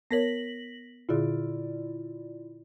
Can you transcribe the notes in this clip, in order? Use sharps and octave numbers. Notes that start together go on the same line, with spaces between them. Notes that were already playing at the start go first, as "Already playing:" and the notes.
B3 A#4 C#5 A#6 B6 F#7
A#2 D3 E4 F4 G#4 D5